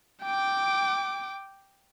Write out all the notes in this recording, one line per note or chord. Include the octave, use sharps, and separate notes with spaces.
G5 D6